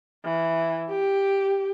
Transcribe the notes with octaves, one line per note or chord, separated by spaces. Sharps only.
E3
G4